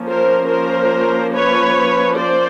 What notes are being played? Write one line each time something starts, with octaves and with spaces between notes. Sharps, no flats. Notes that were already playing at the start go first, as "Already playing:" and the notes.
Already playing: F3 A#3 C#4
A#4 C5
A#4 C5
B4 C#5
C5 D5